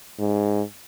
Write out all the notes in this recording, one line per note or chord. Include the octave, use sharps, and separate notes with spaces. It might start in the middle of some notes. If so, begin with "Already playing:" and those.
G#2